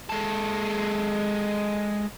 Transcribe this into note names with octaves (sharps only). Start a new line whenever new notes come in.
G#3 A4